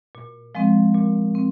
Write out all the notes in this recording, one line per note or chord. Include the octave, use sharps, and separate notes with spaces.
A#2
F3 G#3 C4
A#2
C4